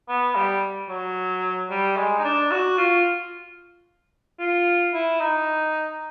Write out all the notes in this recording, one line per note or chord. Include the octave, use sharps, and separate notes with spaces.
B3
G3
F#3
G3
G#3
D#4
D4
F#4
F4
F4
E4
D#4